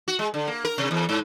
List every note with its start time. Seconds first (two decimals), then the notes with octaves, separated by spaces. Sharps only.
0.08 F#4
0.19 G#3
0.34 D3
0.48 A#3
0.65 A#4
0.78 C3
0.91 E2
1.09 G#2